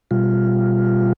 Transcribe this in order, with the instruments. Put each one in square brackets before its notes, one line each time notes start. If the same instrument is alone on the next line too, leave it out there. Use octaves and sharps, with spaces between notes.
[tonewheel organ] B2 G3 F4